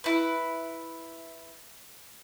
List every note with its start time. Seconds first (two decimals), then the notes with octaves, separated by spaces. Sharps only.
0.04 E4 B4